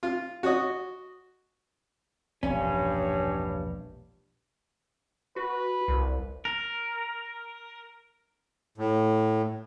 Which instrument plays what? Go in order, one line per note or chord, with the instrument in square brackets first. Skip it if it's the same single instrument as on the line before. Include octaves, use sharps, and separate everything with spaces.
[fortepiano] F4
F#4 C#5 D#5
[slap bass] E1 A#1 C3 [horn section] G2 [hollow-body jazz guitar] C#4 [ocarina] C#5
[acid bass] F#4 [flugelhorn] B4
[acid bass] C2
[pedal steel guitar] A#4
[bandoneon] A2